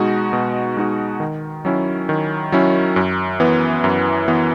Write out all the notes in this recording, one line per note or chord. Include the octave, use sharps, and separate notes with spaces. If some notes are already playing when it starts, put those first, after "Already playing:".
Already playing: B2 G#3 D#4 F#4
B2
G#3 D#4 F#4
D#3
F#3 C#4 E4
D#3
F#3 C#4 E4
F#2
E3 B3
F#2
E3 B3